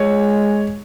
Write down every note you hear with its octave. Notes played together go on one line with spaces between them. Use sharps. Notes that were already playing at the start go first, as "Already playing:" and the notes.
Already playing: G#3 C#5